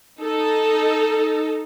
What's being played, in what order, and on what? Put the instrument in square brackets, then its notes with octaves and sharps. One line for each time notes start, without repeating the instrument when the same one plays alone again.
[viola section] D#4 A4